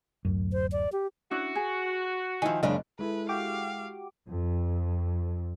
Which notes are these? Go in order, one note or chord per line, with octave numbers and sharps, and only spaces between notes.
D1 F#2
C5
D5
G4
C#4 D4 E4 F#4
G#4
D#3 F3 E4 G#5
F#1 C#3 G#3 D4 D#5
G#3 E4 A4 B4
F#4 G4 F5 D6
F2